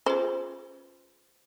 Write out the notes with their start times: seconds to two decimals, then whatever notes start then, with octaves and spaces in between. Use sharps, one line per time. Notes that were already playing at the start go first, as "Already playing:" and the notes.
0.06 C#4 F4 G#4 B4 C5